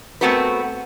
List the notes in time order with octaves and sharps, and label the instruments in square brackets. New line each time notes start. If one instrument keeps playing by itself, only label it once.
[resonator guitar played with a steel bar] A3 B3 C4 F#4 A#4 B4